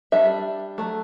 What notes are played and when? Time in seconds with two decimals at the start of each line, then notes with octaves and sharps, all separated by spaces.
0.12 G3 D4 E5
0.78 F#3 A3